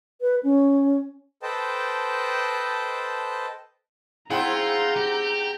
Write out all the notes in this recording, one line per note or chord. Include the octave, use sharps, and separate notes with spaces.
B4
C#4
A4 B4 C5 D#5 G5 A5
C4 E4 F4 G#4 F#5 G5 A#5 G6
G4